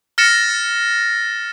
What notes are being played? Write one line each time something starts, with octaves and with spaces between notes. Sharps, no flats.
F6 A6 A#6 C#7 E7